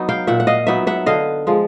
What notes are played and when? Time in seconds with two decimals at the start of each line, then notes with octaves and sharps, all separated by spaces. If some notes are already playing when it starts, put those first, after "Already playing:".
Already playing: F#3 B3 D#4
0.09 F5 G5
0.27 A#2 E5 F#5
0.40 F#5
0.47 D#5 F5
0.67 F#3 B3 D#4 E5 F#5
0.87 E5 F#5
1.06 D3 D#5 F5
1.47 F3 G#3